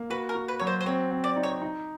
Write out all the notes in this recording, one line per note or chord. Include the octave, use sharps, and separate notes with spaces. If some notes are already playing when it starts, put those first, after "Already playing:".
Already playing: A#3
F#4 B4
A#4
F#4
B4
F#3 C#5
C5
C5
C4 C#5
C4
D5
D#4
C#5
D#4